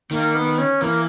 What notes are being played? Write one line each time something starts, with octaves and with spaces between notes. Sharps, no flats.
D#3 A#3
B3
C#4
E3 A#3